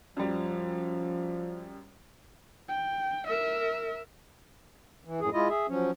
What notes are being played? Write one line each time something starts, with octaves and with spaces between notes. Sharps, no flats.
F#2 F3 G3
G5
A#4 E5
E3
F#2 A2 G#4
G#3 E4 F4 D#5
G#4 E5
F3 F#3 C#4